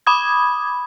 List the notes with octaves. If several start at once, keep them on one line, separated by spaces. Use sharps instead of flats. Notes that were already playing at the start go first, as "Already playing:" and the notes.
B5 D6 D#6 G#6